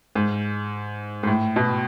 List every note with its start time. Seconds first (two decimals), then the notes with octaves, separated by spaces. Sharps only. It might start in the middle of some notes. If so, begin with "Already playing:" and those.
0.15 G#2
1.23 G#2
1.27 A2
1.56 B2